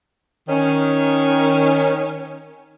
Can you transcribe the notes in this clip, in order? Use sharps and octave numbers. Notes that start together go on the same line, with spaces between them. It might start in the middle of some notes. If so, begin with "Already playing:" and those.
D#3 C#4